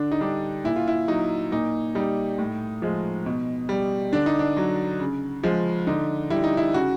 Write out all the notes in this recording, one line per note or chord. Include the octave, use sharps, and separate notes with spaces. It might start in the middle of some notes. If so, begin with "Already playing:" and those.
Already playing: D3 D4
D#4
G3 D4
A#2 E4
F4
E4
F#3 D#4
A#2 D#4
G3 D#4
A2
F3 G#3
B2
G3
D3 D4
D#4
D4
F#3
C#3
F3 G#3
D3 D#4
G3 E4
D#4
E4
C#3 F#4